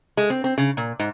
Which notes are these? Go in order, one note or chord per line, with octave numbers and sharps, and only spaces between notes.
G#3
C4
C4
C#3
A#2
G#2